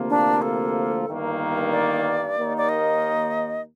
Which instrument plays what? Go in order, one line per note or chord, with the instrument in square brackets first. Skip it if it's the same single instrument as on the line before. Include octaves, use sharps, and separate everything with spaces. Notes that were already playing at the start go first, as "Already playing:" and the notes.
Already playing: [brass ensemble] D2 C3 F3 A#3
[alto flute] D4
A4
[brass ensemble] G1 G2 D#3 A#3
[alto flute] D5
[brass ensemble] D#2 D#3 A#3 D#4
[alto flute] D5
D#5